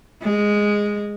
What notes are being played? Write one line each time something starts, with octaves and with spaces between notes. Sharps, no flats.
G#3